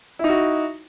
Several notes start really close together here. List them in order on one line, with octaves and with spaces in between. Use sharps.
E4 D#4 F#4